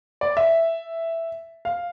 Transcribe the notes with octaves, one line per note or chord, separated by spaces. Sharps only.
D5
E5
F5